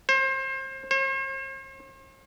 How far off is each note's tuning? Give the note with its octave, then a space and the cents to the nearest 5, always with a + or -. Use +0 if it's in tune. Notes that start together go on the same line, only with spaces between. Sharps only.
C5 +30
C5 +45